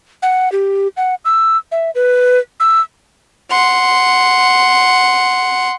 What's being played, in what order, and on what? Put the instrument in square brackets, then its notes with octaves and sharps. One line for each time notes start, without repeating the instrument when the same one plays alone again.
[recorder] F#5
G4
F#5
E6
E5
B4
E6
[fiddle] F#5 C6